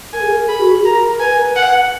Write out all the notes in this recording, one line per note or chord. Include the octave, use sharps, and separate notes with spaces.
A#4 G#5
G#4
A#4
G#4 B5
F#4
G#4
A#4 A#5
B4 G#5
F#5